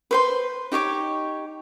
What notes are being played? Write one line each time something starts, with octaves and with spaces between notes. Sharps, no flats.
B4 C5 C6
D#4 G4 C#5 D6